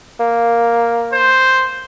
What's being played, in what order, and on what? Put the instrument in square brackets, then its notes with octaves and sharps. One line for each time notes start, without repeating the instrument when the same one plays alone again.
[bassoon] A#3
[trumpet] C5